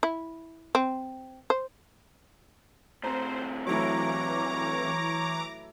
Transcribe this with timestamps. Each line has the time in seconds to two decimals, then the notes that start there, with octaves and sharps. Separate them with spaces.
0.03 E4
0.75 C4
1.50 C5
3.04 A2 C4 C5 A#5
3.67 E3 F#3 A3 E4 C#5 A#5 D6